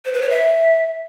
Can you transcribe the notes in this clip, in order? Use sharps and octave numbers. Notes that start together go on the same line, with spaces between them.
C5
B4
C#5
E5